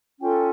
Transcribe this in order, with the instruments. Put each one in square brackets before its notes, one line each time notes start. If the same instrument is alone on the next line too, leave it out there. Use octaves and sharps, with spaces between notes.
[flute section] C#4 F4 A4 G5